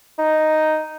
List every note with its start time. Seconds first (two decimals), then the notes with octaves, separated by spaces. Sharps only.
0.18 D#4